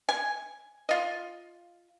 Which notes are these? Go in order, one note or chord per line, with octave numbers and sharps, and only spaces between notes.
G#5
F4 D#5